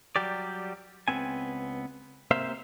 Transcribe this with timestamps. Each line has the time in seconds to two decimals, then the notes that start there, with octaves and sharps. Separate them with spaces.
0.16 F#3 G3 G4 D5
1.08 C#2 F#3 B3 C4 G#5
2.31 C3 A#3 C5 E5 F5